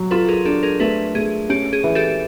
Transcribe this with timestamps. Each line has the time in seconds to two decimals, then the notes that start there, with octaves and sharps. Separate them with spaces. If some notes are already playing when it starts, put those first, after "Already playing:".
Already playing: F#3
0.11 F4 A4 B4
0.29 G#4 A#4
0.45 D4 G4 A4
0.63 G#4 A#4
0.80 A3 A4 B4
1.15 A3 G#4
1.49 C#4 G4
1.73 G#4
1.84 E3
1.95 G4 A4